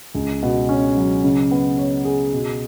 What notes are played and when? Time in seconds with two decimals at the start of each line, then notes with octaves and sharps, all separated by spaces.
0.15 C#2
0.43 B2
0.69 C#4
0.97 F#3
1.24 C#3
1.51 B3
1.78 C#5
2.05 G#4
2.33 B2